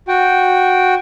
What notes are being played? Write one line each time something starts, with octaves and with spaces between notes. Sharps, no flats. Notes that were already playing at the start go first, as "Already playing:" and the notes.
F#4 G5